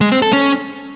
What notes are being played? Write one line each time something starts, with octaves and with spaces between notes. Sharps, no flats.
G#3
C4
A4
C#4